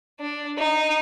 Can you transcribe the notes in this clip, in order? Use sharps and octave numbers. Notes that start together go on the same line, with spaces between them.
D4
D#4